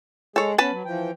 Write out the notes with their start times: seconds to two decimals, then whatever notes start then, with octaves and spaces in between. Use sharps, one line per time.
0.36 G#3 G#4 A4 C#5
0.58 B3 C#4 B4 A5 B5
0.71 F#3
0.85 E3 F3 G5